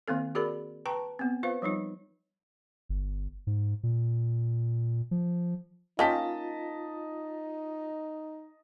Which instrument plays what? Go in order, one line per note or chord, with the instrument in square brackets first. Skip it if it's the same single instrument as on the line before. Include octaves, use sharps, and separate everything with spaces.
[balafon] D#3 A#3 C4 A4
F#4 G#4 A#4 D5 B5
B4 G5 A5 A#5 C#6
B3 C4
F4 B4 C5 F5
F3 G3 D#4 F4
[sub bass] G1
G#2
A#2
F3
[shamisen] A#3 C#4 G4 [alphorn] D#4 [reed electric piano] F4 [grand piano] D#5 A5 B6